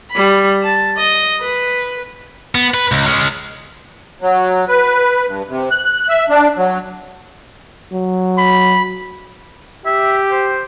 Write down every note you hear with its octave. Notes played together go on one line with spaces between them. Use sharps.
G3 B5
A5
D#5
B4
B3
B4
C#2
G#3 C#4
F#3
B4
G2
C3
F#6
E5
D4
F#3
F#3
B5
G4 E5
C5